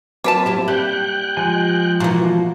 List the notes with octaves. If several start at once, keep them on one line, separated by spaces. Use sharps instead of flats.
F#3 A#3 C4 B4 A5
E4 G4
G3 G5 F#6
F3 G#3 G#5
B2 E3 F#3 A#3 F4 F#4